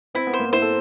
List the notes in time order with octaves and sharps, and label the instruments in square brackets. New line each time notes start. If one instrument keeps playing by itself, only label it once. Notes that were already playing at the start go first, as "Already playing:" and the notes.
[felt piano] C4 [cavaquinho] E4
[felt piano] B3
[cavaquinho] C5
[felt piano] A#3
[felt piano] E4 [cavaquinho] C5
[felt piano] A4